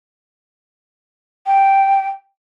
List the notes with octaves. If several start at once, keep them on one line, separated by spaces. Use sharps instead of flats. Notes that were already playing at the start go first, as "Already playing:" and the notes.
G5